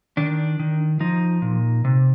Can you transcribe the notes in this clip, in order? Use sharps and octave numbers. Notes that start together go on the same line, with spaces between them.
D#3 D4
D#3
F3 D#4
A#2
C3